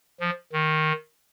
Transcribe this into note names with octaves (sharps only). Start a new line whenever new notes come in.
F3
D#3